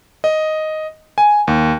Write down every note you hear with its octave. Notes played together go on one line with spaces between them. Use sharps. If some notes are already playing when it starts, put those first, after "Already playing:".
D#5
G#5
D#2